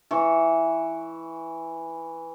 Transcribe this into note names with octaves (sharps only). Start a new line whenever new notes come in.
E3 C#6